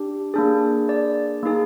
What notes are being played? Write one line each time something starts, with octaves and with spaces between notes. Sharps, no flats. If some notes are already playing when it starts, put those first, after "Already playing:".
Already playing: D4 G4
A#3 D4 G#4
D5
A#3 D#4 G#4